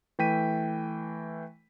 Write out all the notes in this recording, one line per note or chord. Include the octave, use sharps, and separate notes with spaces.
E3 A3 G5 B6 D#7